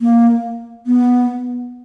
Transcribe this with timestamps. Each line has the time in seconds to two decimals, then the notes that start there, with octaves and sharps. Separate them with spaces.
0.01 A#3
0.86 B3